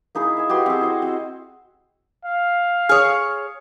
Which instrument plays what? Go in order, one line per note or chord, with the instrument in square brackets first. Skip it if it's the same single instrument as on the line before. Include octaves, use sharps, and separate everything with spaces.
[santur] A#3 D#4 E4 G#4
E5 G#5
F#4 G4 B4 C6
C4 G#4
E4 C5 D#5
C4
[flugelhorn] F5
[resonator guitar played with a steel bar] G#4 C#5 [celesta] D#6 F6